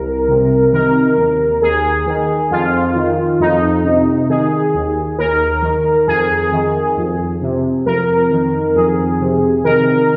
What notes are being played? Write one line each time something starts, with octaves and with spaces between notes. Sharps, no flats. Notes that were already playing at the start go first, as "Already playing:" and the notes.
Already playing: C2 A#4
C3
D#3 A#4
D#2
D#2 G#4
D#3
F2 F4
D#3
F2 D#4
C3
D#3 G#4
D#2
D#2 A#4
D#3
F2 G#4
D#3
F2
C3
F2 A#4
D#3
F2 G#4
C3
D#3 A#4